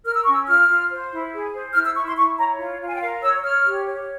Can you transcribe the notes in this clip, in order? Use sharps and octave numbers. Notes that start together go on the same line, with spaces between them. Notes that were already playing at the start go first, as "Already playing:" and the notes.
A#4 F6
E6
C#4 C#6
E6
F4 F6
F4
C5
E4
G#4
C5
E4 F6
E6
E4 C#6
C6
E4 C#6
C#5 A#5
F4
F4
G#5
G5
A#4 F5
C#5 E6
C#5 F6
G4
C#5